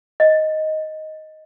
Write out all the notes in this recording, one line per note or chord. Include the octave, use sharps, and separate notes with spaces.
D#5